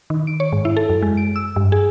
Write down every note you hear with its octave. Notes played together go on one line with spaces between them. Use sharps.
D#3
D7
C#5
G#2
E4
A4
F#2
G#3
D7
E6
G2
G#4